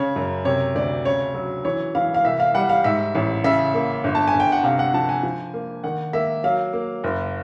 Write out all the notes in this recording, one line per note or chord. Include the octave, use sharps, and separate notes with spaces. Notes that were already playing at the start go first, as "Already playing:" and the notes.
Already playing: C#3 C#5
F#2
C3 C#5
D2 D5
C#3 C#5
F#3
E3 C#5
E3 F5
F5
C2 E5
F5
G3 F#5
F5
G#2 E5
A1
C#3 E5
A#3
G1
A5
G#5
G1
G5
F#5
C3 F5
F#5
F3 A5
G#5
F3
A#3
D#3 F#5
A#3 E5
F#3 F5
A#3
F#1